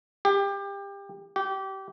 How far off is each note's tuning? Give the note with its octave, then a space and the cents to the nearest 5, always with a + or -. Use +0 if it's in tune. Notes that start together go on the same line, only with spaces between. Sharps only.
G4 +25
G4 -25